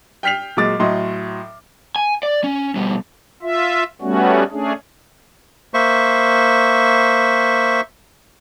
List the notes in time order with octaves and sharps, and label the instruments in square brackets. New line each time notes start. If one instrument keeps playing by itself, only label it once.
[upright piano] G5 F6 B6 C7 F7
A#2 F#3 G#3 D6 A6
A2 F#3 D#5 C6
[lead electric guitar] G#5
D5
C#4
B2 G3
[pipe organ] F4 E5
G3 A3 B3 C#4 F#4
A3 C#4 D4 G#4
[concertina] A#3 C5 E5 C#6